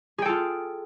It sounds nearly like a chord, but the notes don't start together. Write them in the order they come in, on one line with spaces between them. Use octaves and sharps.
G#4 G5 A4 F4